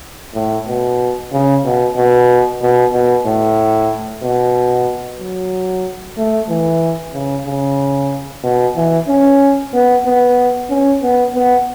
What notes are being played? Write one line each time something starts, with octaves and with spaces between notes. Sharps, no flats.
A2
B2
C#3
B2
B2
B2
B2
A2
B2
F#3
A3
E3
C#3
C#3
B2
E3
C#4
B3
B3
C#4
B3
B3